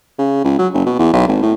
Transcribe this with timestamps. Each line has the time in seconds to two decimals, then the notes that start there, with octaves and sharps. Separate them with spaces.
0.19 C#3
0.44 C#2
0.59 F#3
0.74 F#1
0.86 B2
0.99 E2
1.13 B1
1.28 G#1
1.43 A2